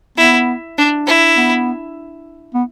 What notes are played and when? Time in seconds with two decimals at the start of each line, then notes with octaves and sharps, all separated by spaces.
0.17 B3 E4
0.78 D4
1.07 E4
1.36 B3
2.54 B3